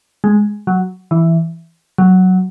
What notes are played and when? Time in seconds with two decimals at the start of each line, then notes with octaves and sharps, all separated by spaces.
0.24 G#3
0.67 F#3
1.11 E3
1.98 F#3